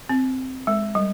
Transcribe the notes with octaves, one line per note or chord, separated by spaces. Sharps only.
C4
G#3
G3